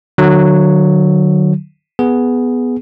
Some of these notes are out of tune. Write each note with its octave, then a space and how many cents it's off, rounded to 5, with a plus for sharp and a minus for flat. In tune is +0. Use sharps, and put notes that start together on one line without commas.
D3 +40 F#3 +0
B3 +0 G#4 +0